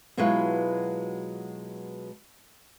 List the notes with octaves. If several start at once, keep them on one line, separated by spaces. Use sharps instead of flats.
B2 F#3 G#3 E4 F4 B4